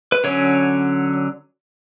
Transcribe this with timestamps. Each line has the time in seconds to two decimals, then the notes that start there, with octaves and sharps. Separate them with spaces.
0.12 B4
0.24 D3 F#3 C#4 C#5